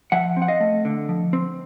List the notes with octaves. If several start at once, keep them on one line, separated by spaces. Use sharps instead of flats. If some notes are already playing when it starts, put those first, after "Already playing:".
F3 E5 F#5
C4
F#5
D#5 F5
A3
D3
F3
C4